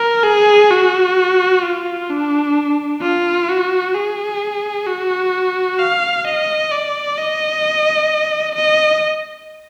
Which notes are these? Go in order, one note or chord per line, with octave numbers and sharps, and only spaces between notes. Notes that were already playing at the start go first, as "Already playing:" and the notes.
Already playing: A#4
G#4
F#4
F4
D4
F4
F#4
G#4
F#4
F5
D#5
D5
D#5
D#5